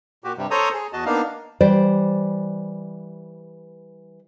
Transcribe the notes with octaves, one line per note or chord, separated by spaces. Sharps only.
A#2 F#4 G4
G2 C3 G3
A4 C5 C#5 A#5 D#6
G#4
E2 F#4 D#5 A5
A#3 B3 D4 D#4 F5
E3 G3 C5 D5